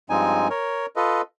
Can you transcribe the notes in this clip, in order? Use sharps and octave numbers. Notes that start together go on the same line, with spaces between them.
G2 F3 G#3 C4 D#4 G#5
A#4 C#5
F4 A4 B4 D#5